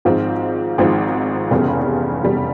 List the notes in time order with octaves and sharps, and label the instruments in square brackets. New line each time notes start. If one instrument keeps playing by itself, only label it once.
[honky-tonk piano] G#1 G#2 F3 C4 F4
G#1 G#2 F3 C4 F4
F1 E2 C#3 G3
F1 E2 C#3 G3